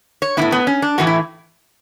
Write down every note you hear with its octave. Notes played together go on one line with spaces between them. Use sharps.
C#5
A2 E3 B3 E4
B3
C#4
D4
A2 E3 A3 F#4
E4